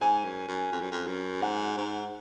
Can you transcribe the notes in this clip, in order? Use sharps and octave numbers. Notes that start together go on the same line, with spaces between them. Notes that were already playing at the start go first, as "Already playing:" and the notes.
G#2 G#5
F#2
F#2
F2
F#2
F2
F#2
G#2 F#5
G#2